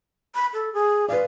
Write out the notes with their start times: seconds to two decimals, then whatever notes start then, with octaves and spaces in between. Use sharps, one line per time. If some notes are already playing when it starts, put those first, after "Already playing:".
0.35 B5
0.54 A4
0.73 G#4
1.09 B4 D5 F5